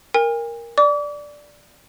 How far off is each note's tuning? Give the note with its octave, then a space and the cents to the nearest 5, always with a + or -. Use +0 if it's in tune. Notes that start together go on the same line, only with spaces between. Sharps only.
A#4 +0 G#5 -45
D5 +0 D6 -40